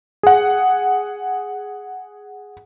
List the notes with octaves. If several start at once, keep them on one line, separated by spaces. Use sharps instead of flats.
G#4 F#5